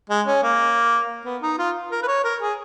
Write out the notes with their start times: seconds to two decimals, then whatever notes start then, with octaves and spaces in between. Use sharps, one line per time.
0.10 G#3
0.27 C#4
0.43 A#3
1.25 B3
1.42 D#4
1.58 F4
1.91 A#4
2.03 B4
2.08 C#5
2.24 A#4
2.41 G#4